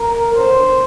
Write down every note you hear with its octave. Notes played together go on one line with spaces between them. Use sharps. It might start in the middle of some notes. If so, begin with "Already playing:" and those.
Already playing: A#4
D3 F#3 B3 C5